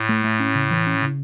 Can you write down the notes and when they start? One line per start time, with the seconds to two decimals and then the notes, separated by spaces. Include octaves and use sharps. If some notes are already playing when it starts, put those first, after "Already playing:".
Already playing: A2
0.09 A3
0.24 A3
0.40 C#4
0.55 C#3
0.71 E3
0.87 C#4
1.02 C#3